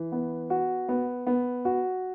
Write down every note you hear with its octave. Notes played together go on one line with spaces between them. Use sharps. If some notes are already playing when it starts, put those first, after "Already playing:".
Already playing: E3
B3
F#4
B3
B3
F#4